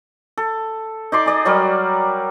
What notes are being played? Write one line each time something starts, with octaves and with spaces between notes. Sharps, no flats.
A4
D#4 D5 C6 D6
G#4 D5 D#5
F#3 G3 A#4 D5